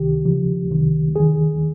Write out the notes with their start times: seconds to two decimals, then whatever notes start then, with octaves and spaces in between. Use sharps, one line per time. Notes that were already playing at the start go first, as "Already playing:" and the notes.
Already playing: C#2 C3 D#3 G4
0.25 D#2 C#3 F3
0.70 C2 C3 D#3
1.16 D#2 D#3 G#4